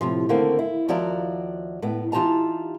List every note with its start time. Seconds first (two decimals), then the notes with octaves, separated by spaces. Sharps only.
0.01 A2 C3 F3
0.29 D3 D#3 A3 A#3 C4
0.59 E4
0.88 D#2 F3 E4 F#4 D5 A#5
1.82 A2 B3
2.12 E3 D#4 F4 G4 A5 A#5